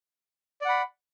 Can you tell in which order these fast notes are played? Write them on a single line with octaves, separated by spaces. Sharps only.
D5 F#5 B5